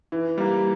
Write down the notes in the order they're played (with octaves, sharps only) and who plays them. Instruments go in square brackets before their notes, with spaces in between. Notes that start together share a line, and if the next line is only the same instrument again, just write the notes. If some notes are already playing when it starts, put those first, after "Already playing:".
[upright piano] E3
G3 A#3